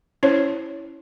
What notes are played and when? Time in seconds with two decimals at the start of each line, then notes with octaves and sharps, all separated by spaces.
0.23 C#4 E4 C5 C#5